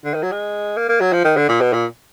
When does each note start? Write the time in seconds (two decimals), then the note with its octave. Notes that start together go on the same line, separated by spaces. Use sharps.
0.05 D3
0.14 D#3
0.23 F#3
0.32 G#3
0.77 A#3
0.89 A#3
1.01 F#3
1.13 F3
1.25 D#3
1.37 D3
1.49 A#2
1.61 B2
1.73 A#2